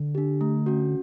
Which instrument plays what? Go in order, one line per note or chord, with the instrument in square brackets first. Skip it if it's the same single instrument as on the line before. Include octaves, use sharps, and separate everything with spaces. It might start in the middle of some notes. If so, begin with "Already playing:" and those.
Already playing: [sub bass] D3
[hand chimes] D4 G4
A3
C#4 F#4